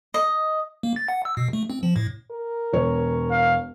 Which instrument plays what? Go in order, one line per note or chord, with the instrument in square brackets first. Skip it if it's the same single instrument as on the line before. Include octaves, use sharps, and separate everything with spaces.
[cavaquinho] D#5
[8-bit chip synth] A#3
A6
F#5
E6
B2
A3
C4
F3
A2
[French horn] A#4
[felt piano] E1 C#5
[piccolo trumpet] F5